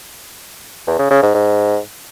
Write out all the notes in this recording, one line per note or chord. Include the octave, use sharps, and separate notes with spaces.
E2
C#3
C#3
G#2
G#2